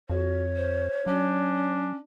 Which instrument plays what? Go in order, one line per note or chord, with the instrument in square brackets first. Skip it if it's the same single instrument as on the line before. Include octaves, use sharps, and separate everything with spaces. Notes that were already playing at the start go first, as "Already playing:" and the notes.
[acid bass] F2 [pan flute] F#4 [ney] C#5
[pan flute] C5
[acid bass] F#3 [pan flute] C#4 [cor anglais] D4